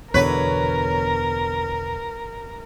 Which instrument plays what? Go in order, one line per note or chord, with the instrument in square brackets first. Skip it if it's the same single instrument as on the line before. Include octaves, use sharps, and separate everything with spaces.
[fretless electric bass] E2 B2 D3 [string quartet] A#4 [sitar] B4 [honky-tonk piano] C#5